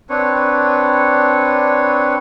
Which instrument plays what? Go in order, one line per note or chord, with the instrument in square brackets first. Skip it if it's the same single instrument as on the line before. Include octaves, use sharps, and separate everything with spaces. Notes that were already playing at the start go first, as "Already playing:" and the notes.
[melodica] C4 D4 B4 C#5